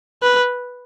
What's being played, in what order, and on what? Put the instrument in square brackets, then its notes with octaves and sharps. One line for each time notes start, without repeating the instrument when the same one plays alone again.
[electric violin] B4